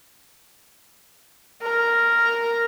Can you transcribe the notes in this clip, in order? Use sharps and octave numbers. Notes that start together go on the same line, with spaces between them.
A#4